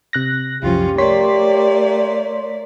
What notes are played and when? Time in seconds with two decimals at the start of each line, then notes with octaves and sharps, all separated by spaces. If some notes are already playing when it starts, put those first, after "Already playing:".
0.13 C3 F#6 A#6
0.63 C2 F#2 F3 C#4 F4 G4
0.98 A3 A#3 C#5 D5 C6 B6